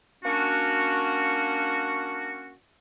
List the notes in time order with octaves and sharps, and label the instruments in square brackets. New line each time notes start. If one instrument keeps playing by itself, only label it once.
[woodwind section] A#3 C#4 D4 F#4